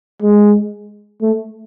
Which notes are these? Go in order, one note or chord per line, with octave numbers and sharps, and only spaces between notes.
G#3
A3